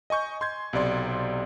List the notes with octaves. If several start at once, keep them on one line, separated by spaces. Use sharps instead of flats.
D#5 G#5 C#6 G6
C6 G6 G#6
B1 C3 D5 C6